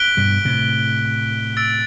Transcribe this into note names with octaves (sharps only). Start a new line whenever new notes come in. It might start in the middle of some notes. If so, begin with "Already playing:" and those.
Already playing: F#6 B6 D7 G7
G2 B2
A2 C3
E6 A6 D7